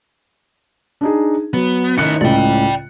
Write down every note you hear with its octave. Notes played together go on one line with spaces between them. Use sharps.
D4 D#4 G#4
F#3 B3
D#3 C#4 E4 F#6 C#7
C#2 A2 C#3 D5 G5